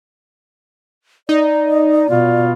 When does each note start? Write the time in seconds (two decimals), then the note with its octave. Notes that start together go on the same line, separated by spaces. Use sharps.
1.29 D#4 D5
2.09 B2 F4